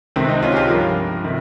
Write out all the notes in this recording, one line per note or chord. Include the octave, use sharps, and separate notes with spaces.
C#2 C3 D#3 C4
C4 D#4
C#4 F4
G4
F4 G#4
G2 F3 G4 A#4
C3 D#3